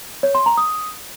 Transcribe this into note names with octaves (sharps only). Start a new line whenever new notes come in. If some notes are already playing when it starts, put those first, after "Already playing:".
C#5
C6
A#5
D#6